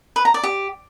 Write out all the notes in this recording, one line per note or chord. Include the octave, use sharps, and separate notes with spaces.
B4
A#5
D5
G4